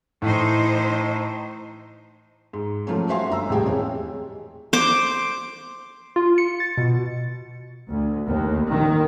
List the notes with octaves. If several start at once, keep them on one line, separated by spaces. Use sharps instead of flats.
A2 E3 D#4 C5
G#2
F3 F#3 A3 A#3 C#4
F#4 C5 E5 F5 G#5 C6
G1 A#5 E6
D#1 A2 C3 G#3 G5 G#5
E2 G#3 C4 C#5
C5 D6
F4
C#7
A6
B2
D2
D#2
D#3